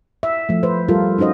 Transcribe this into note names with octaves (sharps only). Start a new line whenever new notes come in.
E5
F3 A3
B4 C5
G3 F4 A4 A#4
C#4 D#4 F#4 C5 D#5